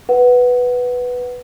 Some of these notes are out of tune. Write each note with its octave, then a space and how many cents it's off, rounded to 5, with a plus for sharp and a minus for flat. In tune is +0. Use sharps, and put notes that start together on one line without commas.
B4 +0 F#5 +0